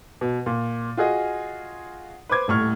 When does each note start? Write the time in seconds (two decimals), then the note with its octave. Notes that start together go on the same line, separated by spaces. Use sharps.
0.21 B2
0.46 A#2
0.97 F4 F#4 G#4 D#5
2.29 B4 C5 D6 G#6
2.48 D#1 A2 C#6 F6